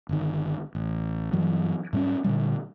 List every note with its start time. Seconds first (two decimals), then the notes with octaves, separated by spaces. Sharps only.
0.09 G1 D#3
0.75 A1
1.33 G2 E3 F#3
1.93 G#2 G3 B3 C#4
2.24 A#2 D3 G3